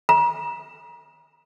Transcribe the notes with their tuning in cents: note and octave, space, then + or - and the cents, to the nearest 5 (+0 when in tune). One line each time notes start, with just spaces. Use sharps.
A#5 +40